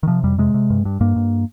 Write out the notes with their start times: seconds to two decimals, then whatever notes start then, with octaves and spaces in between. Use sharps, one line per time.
0.03 D#3
0.08 C3 F3
0.24 F2 G3
0.38 C3 G#3
0.54 C3
0.70 G2
0.85 G2
1.00 G2 A#3
1.16 G2